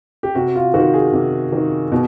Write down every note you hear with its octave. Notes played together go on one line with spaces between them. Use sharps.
G4
C3 F#4
F4
D#3 F#4
G#4
C3
D#3
B2